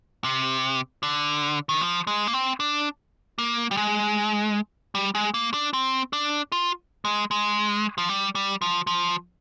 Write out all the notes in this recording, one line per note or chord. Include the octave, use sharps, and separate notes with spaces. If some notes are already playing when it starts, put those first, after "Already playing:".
C3
D3
D#3
F3
G#3
A#3
C4
D4
A#3
G3
G#3
G3
G#3
A#3
D4
C4
D4
F4
G#3
G#3
F3
G3
G3
F3
F3